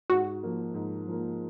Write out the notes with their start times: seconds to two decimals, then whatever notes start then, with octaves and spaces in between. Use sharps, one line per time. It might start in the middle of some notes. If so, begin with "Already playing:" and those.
0.10 G#2 F#4
0.43 F3 A#3
0.74 G#2
1.07 F3 A#3